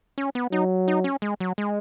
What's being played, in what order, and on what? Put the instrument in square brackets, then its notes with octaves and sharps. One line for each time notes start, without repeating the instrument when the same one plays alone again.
[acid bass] C#4
B3
[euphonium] F#3 [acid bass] D#4
[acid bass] D#4
C#4
G#3
F#3
G#3